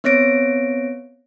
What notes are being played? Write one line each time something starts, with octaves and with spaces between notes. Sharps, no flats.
B3 C4 C#5 A#6 D7